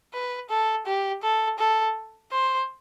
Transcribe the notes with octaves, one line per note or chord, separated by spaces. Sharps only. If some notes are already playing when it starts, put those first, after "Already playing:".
B4
A4
G4
A4
A4
C5